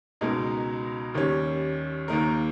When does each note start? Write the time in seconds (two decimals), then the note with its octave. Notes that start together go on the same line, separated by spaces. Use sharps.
0.21 C#2 B2 G#3 D#4 A#4
1.14 D#2 D#3 G3 C#4
2.08 D#2 D#3 A#3 D#4 A#4